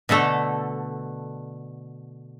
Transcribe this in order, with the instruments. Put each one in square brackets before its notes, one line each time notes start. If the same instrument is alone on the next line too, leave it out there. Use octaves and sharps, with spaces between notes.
[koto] B2 D3 A3 A4